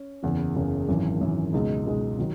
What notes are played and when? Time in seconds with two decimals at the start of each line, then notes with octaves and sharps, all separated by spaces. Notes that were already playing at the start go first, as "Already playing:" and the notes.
Already playing: C#4
0.22 F#1 E2 C#3
0.55 F#1 E2 C#3
0.88 G#1 F#2 E3
1.21 G#1 F#2 E3
1.53 C#2 B2 G#3 D#4
1.86 C#2 B2 G#3 D#4
2.18 D#3 F#3